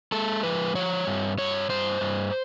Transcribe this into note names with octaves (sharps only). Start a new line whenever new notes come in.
G#3 A4
F3 B4
F3 C#5
G2
G2 C#5
G2 C5
G2